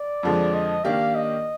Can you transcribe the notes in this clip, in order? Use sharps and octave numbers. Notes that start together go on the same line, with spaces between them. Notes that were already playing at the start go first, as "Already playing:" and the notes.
Already playing: D5
F2 D3 F3 G#3
D#5
D#3 A#3 D4 G4 F5
D#5